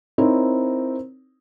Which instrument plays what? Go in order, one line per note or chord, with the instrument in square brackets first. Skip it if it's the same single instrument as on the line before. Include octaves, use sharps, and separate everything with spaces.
[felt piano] C4 D#4 E4 A#4 C5 C#5